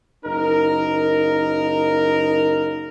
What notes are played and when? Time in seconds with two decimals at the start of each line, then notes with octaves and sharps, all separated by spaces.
0.25 F#1 D#4 A#4